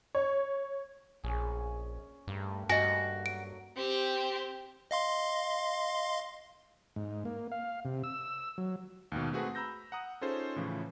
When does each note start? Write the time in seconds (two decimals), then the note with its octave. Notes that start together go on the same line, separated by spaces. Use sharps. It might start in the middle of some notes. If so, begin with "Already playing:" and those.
0.15 C#5
1.24 A#1 C#4 G#4
2.27 G2 A3 A#3
2.70 G2 F#4 D#5 G#5
3.26 F#3 D7
3.76 C4 G4
4.91 D#5 F5 C6
6.96 G#2
7.25 A#3
7.52 F5
7.85 C3
8.04 E6
8.58 F#3
9.12 D#2 G#2 B2
9.32 A3 C4 F#4 G#4 B4 F#5
9.55 A#5 B5 E6 G6 A#6
9.92 F#5 A#5 D#6
10.21 C#4 D#4 F4 G#4 A4 C5
10.56 A2 C#3 E3 F3